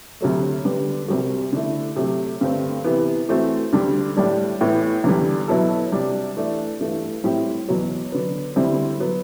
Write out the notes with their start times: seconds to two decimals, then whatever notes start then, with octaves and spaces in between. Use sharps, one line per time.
0.21 D2 C3 F#3 A3
0.65 D3 G3 B3
1.08 C2 C3 G3 C4 F#4
1.53 D3 A3 E4
1.96 C3 F#3 A3
2.41 G2 D3 A3 C4
2.84 C3 E3 B3
3.29 E3 A3 C4 F#4
3.73 D2 D3 G3
4.17 A2 G3 D4
4.61 A2 E3 B3
5.04 E2 D3 G3
5.48 B2 F#3 B3 E4 A4
5.92 C3 G3 D4
6.37 E3 A3 D4
6.80 G2 E3 A3
7.24 A2 G3 C4 E4 G4
7.68 E2 B2 F#3
8.12 D3 F#3 B3
8.56 D2 D3 G3 C4 E4
9.00 F#3 B3